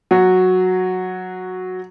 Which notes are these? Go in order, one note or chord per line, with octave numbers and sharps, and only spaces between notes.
F#3 F#4